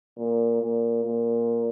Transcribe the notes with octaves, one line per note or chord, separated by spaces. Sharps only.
A#2
A#2
A#2